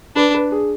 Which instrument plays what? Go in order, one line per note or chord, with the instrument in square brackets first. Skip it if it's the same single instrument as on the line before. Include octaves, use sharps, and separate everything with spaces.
[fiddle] D4 [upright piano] B4
[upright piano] B4
G#4